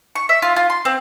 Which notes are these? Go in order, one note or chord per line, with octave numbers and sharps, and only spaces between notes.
C#6
E5
F4
F4
C6
C4